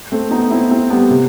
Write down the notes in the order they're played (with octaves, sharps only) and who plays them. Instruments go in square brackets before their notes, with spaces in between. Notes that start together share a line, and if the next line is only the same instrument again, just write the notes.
[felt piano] A3 C4
B3 D#4
C4 E4
C4 E4
G3 B3
C3